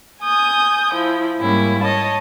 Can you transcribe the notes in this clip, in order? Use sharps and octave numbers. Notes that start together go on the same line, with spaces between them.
G#5 D#6 G6
F3 E4
G#2 G3 A#3 C#4 E4
C#5 D#5 A5